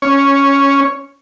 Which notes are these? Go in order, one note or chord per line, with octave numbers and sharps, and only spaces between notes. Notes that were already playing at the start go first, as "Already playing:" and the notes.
C#4 C#5